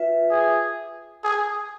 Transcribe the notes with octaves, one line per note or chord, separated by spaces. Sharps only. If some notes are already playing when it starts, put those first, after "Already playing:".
Already playing: F4 B4 E5
G#4
G#4